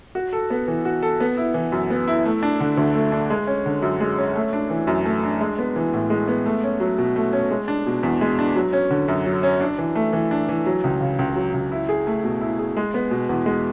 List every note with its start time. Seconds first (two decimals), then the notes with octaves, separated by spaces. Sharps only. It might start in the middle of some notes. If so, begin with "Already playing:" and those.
0.15 F#4
0.33 A4
0.50 B3
0.68 E3
0.85 F#4
1.03 A4
1.20 B3
1.37 E4
1.54 E3
1.72 F#2
1.90 B3
2.08 E4
2.26 A3
2.43 D4
2.60 D3
2.77 D2
2.95 A3
3.12 D4
3.30 G#3
3.47 C#4
3.66 D3
3.82 F#2
4.00 G#3
4.18 C#4
4.36 A3
4.53 D4
4.70 E3
4.87 F#2
5.05 A3
5.23 D4
5.41 G#3
5.59 B3
5.76 E3
5.94 A2
6.10 G#3
6.28 B3
6.46 A3
6.64 C#4
6.80 F#3
6.98 B2
7.16 A3
7.33 C#4
7.51 G#3
7.68 D4
7.86 B2
8.03 E2
8.21 G#3
8.39 D4
8.56 F#3
8.73 C#4
8.91 D3
9.08 F#2
9.26 F#3
9.43 C#4
9.61 D4
9.78 E3
9.96 A3
10.13 E3
10.31 D4
10.49 E3
10.66 F#3
10.84 C#2
11.01 C#3
11.19 C#2
11.36 F#3
11.54 C#2
11.72 E4
11.89 G#4
12.07 A3
12.24 B2
12.41 E4
12.59 G#4
12.77 G#3
12.94 B3
13.11 B2
13.29 E2
13.46 G#3